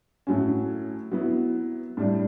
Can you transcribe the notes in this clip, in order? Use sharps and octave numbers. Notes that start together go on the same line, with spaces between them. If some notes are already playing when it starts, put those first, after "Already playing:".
A2 F#3 C#4
F#3 B3 E4
A2 G3 D4